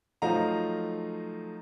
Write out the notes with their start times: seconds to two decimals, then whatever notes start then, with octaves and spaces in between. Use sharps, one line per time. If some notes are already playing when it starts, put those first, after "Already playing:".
0.22 F3 F#3 A3 D#4 F5 A#5